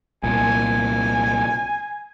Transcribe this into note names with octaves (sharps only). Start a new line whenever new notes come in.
C2 A#2 G#5